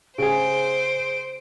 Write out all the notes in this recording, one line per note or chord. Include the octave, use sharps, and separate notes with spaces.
C#3 G#4 C5 D7